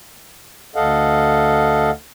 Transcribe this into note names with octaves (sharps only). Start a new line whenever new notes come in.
D2 A4 D#5 F5 F#5